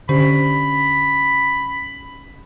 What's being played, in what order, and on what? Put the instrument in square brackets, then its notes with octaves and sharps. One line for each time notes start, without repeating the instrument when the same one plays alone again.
[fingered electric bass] D3 [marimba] C#4 G4 C5 [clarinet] B5